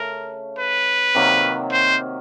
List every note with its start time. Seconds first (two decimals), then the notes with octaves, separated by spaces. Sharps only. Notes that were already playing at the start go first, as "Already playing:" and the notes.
Already playing: C#3 A3 C#4 A#4
0.58 B4
1.15 C3 D#3 F#3 A#3
1.72 C5